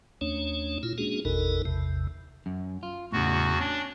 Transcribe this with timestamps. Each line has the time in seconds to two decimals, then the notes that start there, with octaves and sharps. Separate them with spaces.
0.21 D#2 A3 C#4 D4 C#5
0.83 A#2 E4 F4
0.98 G#3 A#3 C#4 D4 F#4 G#4
1.25 G#1 E2 B2 D#4 A4 A#4
1.65 A1 E2 C3
2.46 F#2
2.83 F4
3.12 E2 A2 C#3 F#4
3.60 C#4 D4